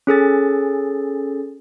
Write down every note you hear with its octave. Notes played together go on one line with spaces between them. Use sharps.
C#4 G#4 A4 A6